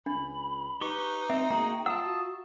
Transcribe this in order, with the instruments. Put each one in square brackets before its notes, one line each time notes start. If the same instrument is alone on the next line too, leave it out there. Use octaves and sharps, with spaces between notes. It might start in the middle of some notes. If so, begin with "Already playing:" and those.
[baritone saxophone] C#2 [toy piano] D4 [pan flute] B5
[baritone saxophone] D#4 [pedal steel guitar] G4 C#6 [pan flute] B4
[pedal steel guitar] C4 [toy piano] E5
[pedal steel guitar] A#3 F#4 G#4 [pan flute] G5 [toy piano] A#5
[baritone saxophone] F4 [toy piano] F#5 [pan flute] G5 [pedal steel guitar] A5 D#6 E6
[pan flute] F#4